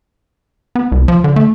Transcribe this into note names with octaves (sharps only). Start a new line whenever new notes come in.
B3
C2
F3
D3
A3